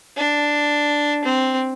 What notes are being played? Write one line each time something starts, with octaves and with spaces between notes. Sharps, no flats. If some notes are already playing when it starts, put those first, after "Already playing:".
D4
C4